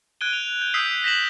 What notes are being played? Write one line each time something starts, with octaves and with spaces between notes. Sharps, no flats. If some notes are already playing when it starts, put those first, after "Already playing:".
F#6 G#6 D7 D#7 G7
F7
G6 G7
D#6 E6 G6 B6 C7
A#6 B6 E7 F#7